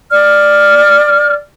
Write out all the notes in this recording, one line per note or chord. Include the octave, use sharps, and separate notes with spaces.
D5 F6